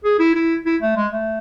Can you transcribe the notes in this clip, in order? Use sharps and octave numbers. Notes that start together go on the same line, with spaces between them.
G#4
E4
E4
E4
A3
G#3
A3